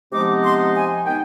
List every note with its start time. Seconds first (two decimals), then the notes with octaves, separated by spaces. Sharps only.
0.12 C3 F3 G#3 B3 D#4 D6
0.44 C6
0.75 G#5
1.05 D#3 B3 D#4 G5